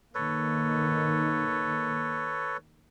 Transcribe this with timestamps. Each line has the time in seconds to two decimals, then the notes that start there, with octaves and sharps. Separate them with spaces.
0.15 D#3 A#3 A4 B4 C#5